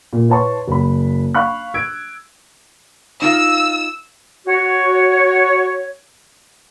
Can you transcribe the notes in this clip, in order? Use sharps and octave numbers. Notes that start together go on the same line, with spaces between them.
A#2
E4 B4 C#5 A5 C6 C#6
F#1 B5
F5 B5 C#6 F#6
E6 G#6 D7
D#4 F4 F5 E6
F#4 C#5